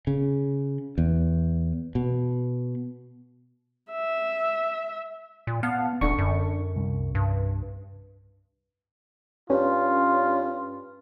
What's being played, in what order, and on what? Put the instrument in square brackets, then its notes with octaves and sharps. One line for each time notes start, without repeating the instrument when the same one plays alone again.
[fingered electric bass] C#3
E2
B2
[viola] E5
[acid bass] A#2
[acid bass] B3 [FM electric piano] F5 F#5 A5
[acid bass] D#1 [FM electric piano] D3 D4 C#6
[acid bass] F#2
[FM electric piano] C2
[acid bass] G2
[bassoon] G2 [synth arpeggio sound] C#4 [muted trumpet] F4